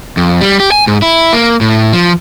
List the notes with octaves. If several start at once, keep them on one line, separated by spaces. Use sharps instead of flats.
F2
G3
G4
G#5
G#2
E4
A#3
A2
F3